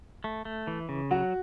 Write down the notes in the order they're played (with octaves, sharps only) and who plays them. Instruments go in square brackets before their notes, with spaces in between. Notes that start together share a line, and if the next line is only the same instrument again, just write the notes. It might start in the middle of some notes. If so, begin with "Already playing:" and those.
[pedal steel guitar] A3
A3
E3
C#3
[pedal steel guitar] F#3 [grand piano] F#4